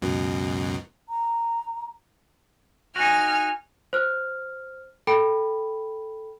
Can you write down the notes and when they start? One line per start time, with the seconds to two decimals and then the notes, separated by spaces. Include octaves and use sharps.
0.02 C#2 F#2 B2
1.09 A#5
2.96 D#4 F#4 G#5 F6
3.93 C5 F6
5.07 A4 G5 B5